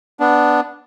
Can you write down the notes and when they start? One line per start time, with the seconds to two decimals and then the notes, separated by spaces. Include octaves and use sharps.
0.20 B3 D4